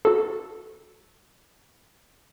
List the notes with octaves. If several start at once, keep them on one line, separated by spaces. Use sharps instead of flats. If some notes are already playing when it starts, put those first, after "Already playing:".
F#4 A4